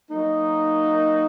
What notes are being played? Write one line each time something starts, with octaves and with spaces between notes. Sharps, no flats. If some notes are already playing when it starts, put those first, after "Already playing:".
F#3 A#3 D#4